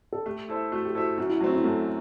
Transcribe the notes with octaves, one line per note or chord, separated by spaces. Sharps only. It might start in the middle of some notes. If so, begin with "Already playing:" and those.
A4
A3 G4
E4 A4 C5 E5
A3 F#4
G4
E4 F#4 A4 C5 E5
F#2 F#4
E4
F#3 A3 C4 F#4
E4
F#2 A3